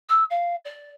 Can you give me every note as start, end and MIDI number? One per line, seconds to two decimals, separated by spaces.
0.09 0.24 88
0.30 0.56 77
0.65 0.91 74